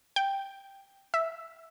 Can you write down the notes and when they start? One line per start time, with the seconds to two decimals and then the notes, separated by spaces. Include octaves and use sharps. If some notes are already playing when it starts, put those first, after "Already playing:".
0.16 G5
1.14 E5